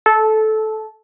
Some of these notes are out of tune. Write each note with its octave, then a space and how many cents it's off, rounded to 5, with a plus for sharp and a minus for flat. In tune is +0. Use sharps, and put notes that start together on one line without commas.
A4 -15